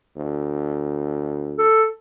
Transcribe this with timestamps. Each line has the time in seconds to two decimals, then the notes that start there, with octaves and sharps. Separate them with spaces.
0.17 D2
1.58 A4